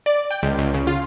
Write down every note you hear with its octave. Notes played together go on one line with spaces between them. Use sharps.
D5
G5
C#2
C#2
C#3
F4